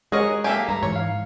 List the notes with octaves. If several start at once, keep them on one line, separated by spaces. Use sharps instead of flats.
G#3 F#4 G#4 A#4 C#5 D#5
A#3 G4 A4 E5 F5 G#5
G2 A#5
G#2 E3 C#5
F5